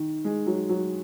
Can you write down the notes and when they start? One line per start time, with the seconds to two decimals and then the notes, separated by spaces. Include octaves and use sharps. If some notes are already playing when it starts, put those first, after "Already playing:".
Already playing: D#3
0.24 G#3
0.46 F#3
0.69 F#3